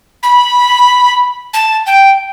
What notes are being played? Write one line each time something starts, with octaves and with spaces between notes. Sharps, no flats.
B5
A5
G5